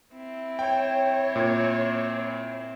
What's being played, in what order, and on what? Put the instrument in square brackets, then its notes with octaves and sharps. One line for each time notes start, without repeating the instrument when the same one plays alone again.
[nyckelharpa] C4 E4
[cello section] C#5 [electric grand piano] G5
[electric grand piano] A#2